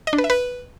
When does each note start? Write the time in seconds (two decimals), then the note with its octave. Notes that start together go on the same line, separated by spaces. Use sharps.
0.07 D#5
0.13 D4
0.18 B4
0.24 E5
0.30 B4